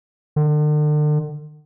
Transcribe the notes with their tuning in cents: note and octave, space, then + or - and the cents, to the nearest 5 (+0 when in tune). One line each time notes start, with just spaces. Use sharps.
D3 +40